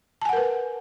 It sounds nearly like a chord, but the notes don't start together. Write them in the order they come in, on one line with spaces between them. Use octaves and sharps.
A5 G#5 F#5 A#4 B4